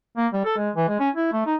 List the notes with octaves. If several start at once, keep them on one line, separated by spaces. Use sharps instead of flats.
A#3
G3
A4
G#3
E3
G#3
C#4
E4
A3
D#4